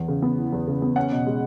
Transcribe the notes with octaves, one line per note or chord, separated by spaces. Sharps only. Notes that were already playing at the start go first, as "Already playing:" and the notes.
Already playing: E2 E3
C#3
B3
E3
E2
C#3
B3
C#4 F#5
B2
G#3